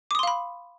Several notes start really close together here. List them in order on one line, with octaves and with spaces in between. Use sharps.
D6 D#6 C6 F5 B5